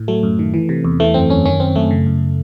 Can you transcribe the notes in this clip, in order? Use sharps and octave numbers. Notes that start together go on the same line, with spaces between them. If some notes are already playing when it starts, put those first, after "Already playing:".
Already playing: A2
F#3 A3
F#2
D#3
E3
C3
E2
E3 A3
F#2 C4
F#2 C#4
D#3 C#4
F#2 C4
F#2 A3
C#3
F#2